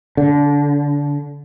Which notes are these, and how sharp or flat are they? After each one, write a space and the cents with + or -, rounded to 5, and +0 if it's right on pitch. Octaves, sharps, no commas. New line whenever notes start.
D3 -25